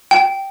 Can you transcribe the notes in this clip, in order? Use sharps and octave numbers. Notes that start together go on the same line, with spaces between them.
G5